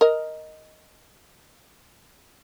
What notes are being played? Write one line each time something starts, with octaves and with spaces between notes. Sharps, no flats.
A#4 D#5